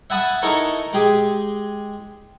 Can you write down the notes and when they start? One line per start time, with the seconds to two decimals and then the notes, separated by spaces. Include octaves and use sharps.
0.10 E5 F#5 G#5 A5 B5 D#6
0.42 D#4 E4 A4 A#4 G#5 C#6
0.93 G#3 G4 G#4